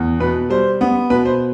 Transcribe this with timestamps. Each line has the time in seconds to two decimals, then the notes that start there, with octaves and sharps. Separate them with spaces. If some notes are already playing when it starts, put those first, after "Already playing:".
Already playing: E2
0.20 B2 B4
0.50 G3 C5
0.81 B3
1.10 B2 B4
1.25 C5